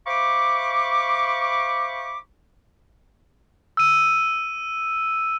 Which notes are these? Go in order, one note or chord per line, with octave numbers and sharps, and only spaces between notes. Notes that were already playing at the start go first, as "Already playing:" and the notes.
C5 E5 F5 B5 C#6 D6
E6 D#7